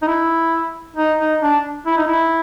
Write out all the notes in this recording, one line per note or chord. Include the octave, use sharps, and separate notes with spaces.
D#4
E4
D#4
D#4
D4
E4
D#4
E4